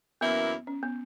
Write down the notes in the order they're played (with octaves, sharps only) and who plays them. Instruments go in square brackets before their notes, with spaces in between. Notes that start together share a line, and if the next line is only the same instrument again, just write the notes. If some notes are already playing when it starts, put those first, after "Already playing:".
[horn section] F#2 E3 A#3 E4 [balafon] B3
[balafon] C#4
B3